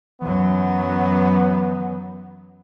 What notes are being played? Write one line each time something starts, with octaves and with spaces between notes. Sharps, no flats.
F#2 E3 F#3 B3